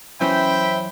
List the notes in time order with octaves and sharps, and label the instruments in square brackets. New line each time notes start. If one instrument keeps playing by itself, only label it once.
[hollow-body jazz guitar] F#2 E3 C#4 [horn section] C5 E5 G5 [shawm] B5